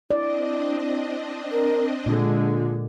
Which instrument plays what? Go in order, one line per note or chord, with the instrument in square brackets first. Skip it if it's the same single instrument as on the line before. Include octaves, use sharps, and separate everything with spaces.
[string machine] C4 D4 D#5 [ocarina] E4 [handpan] D5
[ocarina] A#4
[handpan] A#2 [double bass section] D3 G#3 [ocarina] F4